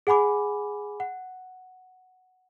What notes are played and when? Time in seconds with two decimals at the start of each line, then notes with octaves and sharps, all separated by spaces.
0.07 G#4 F#5 G#5 B5 D6
1.00 F#5